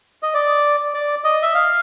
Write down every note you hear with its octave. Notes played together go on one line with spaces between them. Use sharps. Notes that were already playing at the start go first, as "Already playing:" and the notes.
D#5
D5
D5
D#5
E5
F5